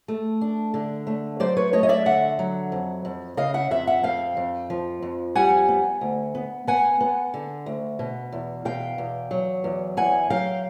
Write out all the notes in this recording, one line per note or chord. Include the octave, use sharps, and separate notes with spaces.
A3
D4
D3
A3
F#3 C5 D5
B4 C#5
A3 C#5 D#5
D#5
D5 E5
D3 E5 F#5
F#3
F2
F2
C#3 D#5 F5
E5 F#5
F2 E5 F#5
E5 F#5
F2 F5 G5
F2
F3
F2
G3 F#5 G#5
B3
D2
B3
B3 F#5 G#5
B3
D3
D2
B2
E2
B2 F5 G5
E2
F#3
E2
E2 F#5 G#5
F#3 F5 G5